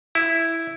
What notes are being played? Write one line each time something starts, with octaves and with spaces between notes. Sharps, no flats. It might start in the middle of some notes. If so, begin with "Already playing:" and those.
E4